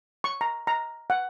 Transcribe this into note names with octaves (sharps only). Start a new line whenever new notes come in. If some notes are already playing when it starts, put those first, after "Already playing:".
C#6
A#5
A#5
F#5